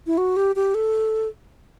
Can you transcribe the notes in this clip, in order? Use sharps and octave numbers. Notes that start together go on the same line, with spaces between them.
E4
F#4
G4
G4
A4